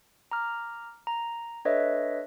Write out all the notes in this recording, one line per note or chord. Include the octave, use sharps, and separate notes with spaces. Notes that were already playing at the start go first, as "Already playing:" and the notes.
A#5 D6 F6
A#5
D4 A4 B4 C#5 D#5 E5